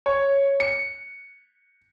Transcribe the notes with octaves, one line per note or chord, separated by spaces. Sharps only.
C#5
C#7